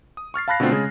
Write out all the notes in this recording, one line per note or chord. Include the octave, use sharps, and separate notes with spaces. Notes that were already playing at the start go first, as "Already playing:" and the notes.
D#6
C#6 F6 A6 C7
F5 A5 B5 F#6 A#6 C7
B2 D3 A3 B3 C4 F4
C#3 G#3 G#4